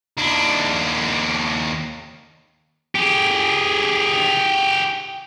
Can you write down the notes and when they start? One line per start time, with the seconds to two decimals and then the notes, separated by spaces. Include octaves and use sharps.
0.17 D#2 D4
2.95 G4 G#4